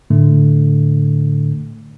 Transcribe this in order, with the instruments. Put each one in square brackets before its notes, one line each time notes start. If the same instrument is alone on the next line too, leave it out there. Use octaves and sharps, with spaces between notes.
[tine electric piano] A2 D3 A3